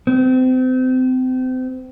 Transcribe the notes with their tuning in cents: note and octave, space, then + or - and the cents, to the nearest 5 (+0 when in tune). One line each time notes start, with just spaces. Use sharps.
C4 -30